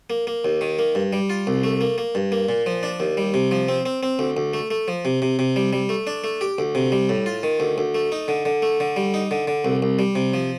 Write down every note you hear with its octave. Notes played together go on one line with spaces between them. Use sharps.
A#3
A#3
D#2
D#3
A#3
G2
G3
F4
C2
A3
A#3
A#3
G2
A#3
A#2
F3
D4
D#2
G3
C3
F3
C4
C4
C4
D2
D2
A3
A3
F3
C3
C3
C3
G3
G3
A3
D4
A3
G4
D2
C3
G3
A2
F4
D#3
D2
D2
A3
D#4
D3
D3
A3
D3
G3
D#4
D3
D3
C2
C2
G3
C3
F3